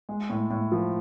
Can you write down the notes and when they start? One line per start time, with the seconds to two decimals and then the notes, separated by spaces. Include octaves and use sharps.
0.09 G#3
0.30 A2
0.50 A2
0.72 F3